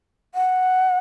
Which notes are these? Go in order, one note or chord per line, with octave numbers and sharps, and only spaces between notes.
F#5